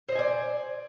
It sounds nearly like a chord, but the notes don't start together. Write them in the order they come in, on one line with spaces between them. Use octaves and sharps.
C5 D#5 G#5 D5